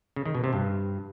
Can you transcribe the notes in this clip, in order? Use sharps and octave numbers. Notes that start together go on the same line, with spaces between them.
C#3
D#3
B2
C3
G2